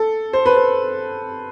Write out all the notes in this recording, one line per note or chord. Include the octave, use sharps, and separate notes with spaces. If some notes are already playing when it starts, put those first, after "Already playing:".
Already playing: A4
C5
B4
C5